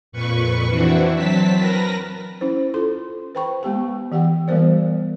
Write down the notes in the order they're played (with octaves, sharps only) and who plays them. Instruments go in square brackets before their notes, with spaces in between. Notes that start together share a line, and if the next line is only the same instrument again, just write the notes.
[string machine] F2 A#2 B4 C#6
E3 C4 D4 E4 F#4
F#3 C4 A5 B6
A#4 B4 A#6
[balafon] C#4 E4 C5
F4 A4 C6
B4 C5 G5 B5 C#6
G#3 B3 G4 G5
E3 G4 F#5 G5
E3 G3 B3 A#4 C5 D5